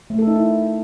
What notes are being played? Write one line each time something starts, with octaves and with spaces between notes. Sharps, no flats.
A3
A4
D#4
E4